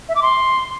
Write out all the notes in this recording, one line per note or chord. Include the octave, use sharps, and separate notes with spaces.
E5
D6
C6